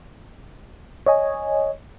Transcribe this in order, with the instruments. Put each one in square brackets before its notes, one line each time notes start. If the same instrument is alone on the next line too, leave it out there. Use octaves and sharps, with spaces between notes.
[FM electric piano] C#5 D#5 G#5